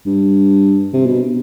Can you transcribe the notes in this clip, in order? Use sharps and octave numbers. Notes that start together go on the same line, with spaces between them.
G2
C3
B2